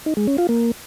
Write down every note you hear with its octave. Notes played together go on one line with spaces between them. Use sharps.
D#4
G#3
C#4
F4
A#3